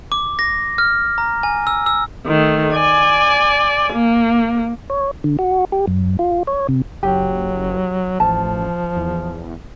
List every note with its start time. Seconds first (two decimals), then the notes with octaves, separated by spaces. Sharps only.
0.12 D6
0.39 A#6
0.78 F6
1.18 A#5
1.43 G#5
1.67 E6
1.86 E6
2.26 D#3 A3
2.74 D5 G#5
3.93 A#3
4.90 C#5
5.24 D3
5.39 F#4
5.72 G4
5.87 F#2
6.19 F4
6.47 C#5
6.69 C3
7.03 F#1 F#3 G4
8.20 A1 F3 A5
8.96 E2